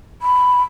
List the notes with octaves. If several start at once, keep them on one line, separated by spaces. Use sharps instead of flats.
B5